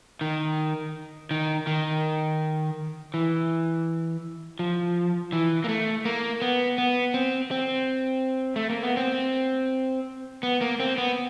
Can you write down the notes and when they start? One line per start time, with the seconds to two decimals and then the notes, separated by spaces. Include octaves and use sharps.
0.21 D#3
1.31 D#3
1.67 D#3
3.14 E3
4.59 F3
5.33 E3
5.64 A#3
5.69 A3
6.05 A#3
6.42 B3
6.78 B3
7.14 C4
7.51 C4
8.56 A3
8.70 A#3
8.83 B3
8.97 C4
10.43 B3
10.61 A#3
10.80 C4
10.98 B3